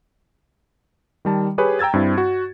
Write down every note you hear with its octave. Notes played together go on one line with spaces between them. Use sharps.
D#3 G3 A5
G4 G#4 B4 C#5 G#5
G5 A#5 E6 G#6 A6
G2 C4 E4
F#4